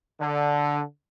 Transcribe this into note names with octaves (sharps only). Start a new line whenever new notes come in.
D3